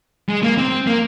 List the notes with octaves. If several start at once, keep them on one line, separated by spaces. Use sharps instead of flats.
G#3
A#3
C4
A#3